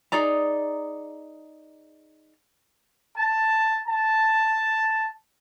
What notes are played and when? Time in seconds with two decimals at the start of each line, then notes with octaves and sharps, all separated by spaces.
0.12 D#4 G#4 D5 A#5
3.17 A5
3.87 A5